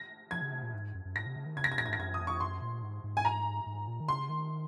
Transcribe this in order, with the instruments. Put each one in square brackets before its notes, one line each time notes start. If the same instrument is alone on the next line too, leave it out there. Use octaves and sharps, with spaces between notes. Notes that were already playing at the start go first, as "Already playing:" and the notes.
Already playing: [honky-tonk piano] A#6
[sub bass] F3 [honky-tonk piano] G#6
[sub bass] C#3
C3
A#2
G#2
F#2
F#2
[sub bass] G#2 [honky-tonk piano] A#6
[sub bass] C3
C#3
D#3
[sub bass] C#3 [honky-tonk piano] G#6
[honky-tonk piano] A#6
[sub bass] C3 [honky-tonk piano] G#6
[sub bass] A#2 [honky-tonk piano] A#6
[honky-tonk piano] G#6
[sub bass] G#2 [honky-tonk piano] A#6
[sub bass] F#2 [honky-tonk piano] G#6
[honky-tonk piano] D#6
[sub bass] F2
[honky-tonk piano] C#6
[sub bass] F#2 [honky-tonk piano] C6
[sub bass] A#2
G#2
G#2
[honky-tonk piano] G#5
A#5
[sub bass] G#2
A#2
D#3
[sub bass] C#3 [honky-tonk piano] C6
[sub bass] D#3